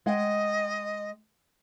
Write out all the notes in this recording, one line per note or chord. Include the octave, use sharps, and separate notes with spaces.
G#3 D#5 F#5 G5